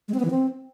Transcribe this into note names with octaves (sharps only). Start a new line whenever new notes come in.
G#3
C4
B3
E3
C4